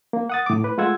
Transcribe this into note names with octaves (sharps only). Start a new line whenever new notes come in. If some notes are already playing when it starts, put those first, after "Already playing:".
A#3
F#5 D#6 A6
A2 D6
B4
G#3 A3 F4 F#5 E6 G#6